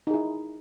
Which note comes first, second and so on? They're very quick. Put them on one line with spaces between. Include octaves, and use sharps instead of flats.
D#4 G#4 E4